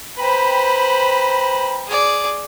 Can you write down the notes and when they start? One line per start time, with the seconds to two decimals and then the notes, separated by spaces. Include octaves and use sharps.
0.18 B4 C5 G5 A#5 B5
1.88 G#4 D5